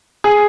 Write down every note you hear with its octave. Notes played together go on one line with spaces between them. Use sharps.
G#4